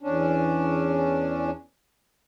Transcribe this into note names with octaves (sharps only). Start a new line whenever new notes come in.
E2 C#4 D4